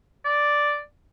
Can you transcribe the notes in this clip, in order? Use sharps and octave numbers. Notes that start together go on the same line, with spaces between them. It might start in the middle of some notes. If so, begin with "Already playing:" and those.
D5